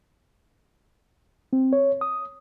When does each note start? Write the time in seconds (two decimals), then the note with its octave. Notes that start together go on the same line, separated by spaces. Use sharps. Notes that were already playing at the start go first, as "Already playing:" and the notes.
1.53 C4
1.73 C#5
2.01 D#6